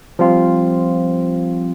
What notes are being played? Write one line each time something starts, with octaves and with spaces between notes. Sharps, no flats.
F3 G3 C4 F4